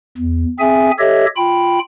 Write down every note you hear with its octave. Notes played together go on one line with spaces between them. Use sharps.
E2
C4 G#4 E5 G#5
G4 A4 C#5 D#5 E5
F4 G5 B5